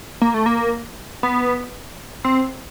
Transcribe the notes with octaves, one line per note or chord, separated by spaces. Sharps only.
A#3
A3
A#3
B3
C4